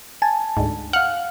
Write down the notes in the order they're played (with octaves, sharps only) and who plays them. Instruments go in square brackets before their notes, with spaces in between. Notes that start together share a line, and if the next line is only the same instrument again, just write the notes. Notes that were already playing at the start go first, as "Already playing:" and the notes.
[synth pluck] G#5 A5
[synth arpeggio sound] D2 G#2
[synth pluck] F5 F6 [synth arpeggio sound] F#5